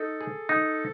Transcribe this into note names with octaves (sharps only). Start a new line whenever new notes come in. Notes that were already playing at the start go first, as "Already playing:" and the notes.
Already playing: D#4 A4
G#4
D#4